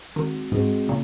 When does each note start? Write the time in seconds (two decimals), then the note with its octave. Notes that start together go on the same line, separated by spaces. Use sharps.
0.16 D#3 G#3 C4 F#4
0.52 G#2 G#3 C4 F#4
0.88 A#2 C#3